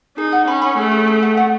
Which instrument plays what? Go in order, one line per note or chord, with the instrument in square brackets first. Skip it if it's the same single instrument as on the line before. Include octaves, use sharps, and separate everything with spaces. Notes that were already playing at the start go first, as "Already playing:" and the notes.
[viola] D#4 [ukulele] G#4
[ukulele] F#5
[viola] C#4 [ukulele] B5
[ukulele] B5
[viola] A3 [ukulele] G#4
[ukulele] G#4
G#4
F#5
F#5